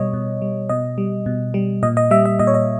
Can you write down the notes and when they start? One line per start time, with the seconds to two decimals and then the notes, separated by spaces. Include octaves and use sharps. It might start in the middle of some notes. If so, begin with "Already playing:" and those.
Already playing: B2 G3 C#5 D#5
0.13 B2
0.42 G3
0.69 B2 D#5
0.98 G3
1.26 B2
1.54 G3
1.83 A#2 D#5
1.97 D#5
2.11 G3 E5
2.25 E5
2.39 A#2 D#5
2.47 C#5
2.54 D#5